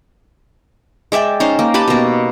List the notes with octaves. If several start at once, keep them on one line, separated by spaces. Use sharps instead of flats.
G#3 D5 E5 G5
C#4 D#4 C5
A#3
G4 B4 A5 B5
B2 A#3